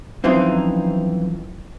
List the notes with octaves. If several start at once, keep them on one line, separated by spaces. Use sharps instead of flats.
F#2 E3 F3 C4 D#4